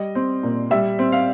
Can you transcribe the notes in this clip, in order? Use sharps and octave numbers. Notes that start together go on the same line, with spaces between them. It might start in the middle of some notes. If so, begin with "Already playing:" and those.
Already playing: G3 D#5
C4
A#2
G3 E5
C4
F5